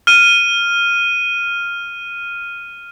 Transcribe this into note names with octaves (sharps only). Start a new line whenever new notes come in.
F6 D#7